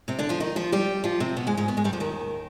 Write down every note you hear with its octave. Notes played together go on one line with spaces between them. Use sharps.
C3 C4
D3 D4
F3 F4
D#3 D#4
F3 F4
G3 G4
F3 F4
C3 C4
B2 B3
G#2 G#3
G#2 G#3
B2 B3
G#2 G#3
G2 G3
F2 F3
D#2 D#3